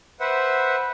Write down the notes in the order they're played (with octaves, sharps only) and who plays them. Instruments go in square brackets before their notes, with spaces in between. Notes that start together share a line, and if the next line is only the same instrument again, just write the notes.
[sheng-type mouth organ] B4 C5 E5 F#5